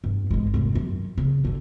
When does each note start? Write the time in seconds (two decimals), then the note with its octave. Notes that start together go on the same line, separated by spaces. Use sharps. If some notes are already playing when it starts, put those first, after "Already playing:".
0.04 G2
0.31 G#1 G#3
0.54 F1 G#2
0.75 F#2
1.18 C#3
1.45 F#2 D3